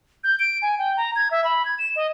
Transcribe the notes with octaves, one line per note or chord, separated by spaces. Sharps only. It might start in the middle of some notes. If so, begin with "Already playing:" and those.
G6
D7
G#5
G5
A#5
G#6
E5
B5
G#6
E7
D#5